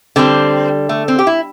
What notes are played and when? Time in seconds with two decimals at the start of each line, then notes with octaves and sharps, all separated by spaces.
0.16 D3 G3 C4
0.89 A3
1.08 C4
1.19 G4
1.27 E4